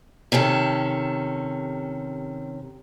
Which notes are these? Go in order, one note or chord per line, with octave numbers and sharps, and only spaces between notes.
C3 D#3 C#4 A4